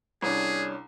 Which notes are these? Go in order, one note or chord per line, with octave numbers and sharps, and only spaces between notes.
C2 C#4 D4 G#4